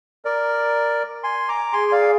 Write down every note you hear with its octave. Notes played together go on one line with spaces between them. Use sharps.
A#4 D5
G#5 C6
A#5 D6
G#4 G#5 C6
D5 F5